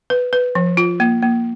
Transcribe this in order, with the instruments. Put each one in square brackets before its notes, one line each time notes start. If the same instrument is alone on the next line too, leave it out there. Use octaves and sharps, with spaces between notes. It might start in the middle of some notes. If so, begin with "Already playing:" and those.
[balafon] B4
B4
F3
F4
A#3
A#3